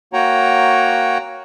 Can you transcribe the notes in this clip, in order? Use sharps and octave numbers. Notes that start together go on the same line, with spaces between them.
A#3 F#4 C#5 F#5 G5 A#5